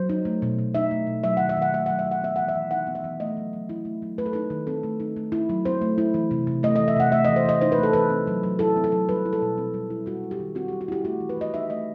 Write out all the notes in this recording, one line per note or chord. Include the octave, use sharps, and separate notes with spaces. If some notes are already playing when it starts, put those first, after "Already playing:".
Already playing: F#3 C5
D#4
A3
B2
B2
D#4 E5
A3
B2
F#3 E5
D#3 F#5
E5
D#3 F#5
A3 E5
F#3 F#5
E5
D#3
F#5
B3 E5
E3 F#5
E5
E3
D#4 F#5
B3
E5
E3
A3 D#5
F#3
F#3
E4
A3
F#3
A3 B4
A4
D#4 B4
D#3
C4 A4
A3
D#4
A3
E4
F#3
C4 C5
A3
E4
E3
C3
C3
A3 D#5
D#5
E3
E5
C3 F#5
A3 E5
D#5
E3
C5
E3 D#5
D#4 C5
B4
A3 A4
E3 B4
C4
F#3
F#3
E4 A4
C4
A4
F#3
G3 B4
E4
A4
B2
C4
G3
E4
G3 F#4
E4
G4
D#3
C4 F#4
G4
G3
F#4
E4 G4
A3 F#4
E3
B4
E3 D#5
D#4 E5
A3 D#5